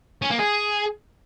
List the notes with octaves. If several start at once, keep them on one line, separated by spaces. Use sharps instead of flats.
C#4
A#3
G#4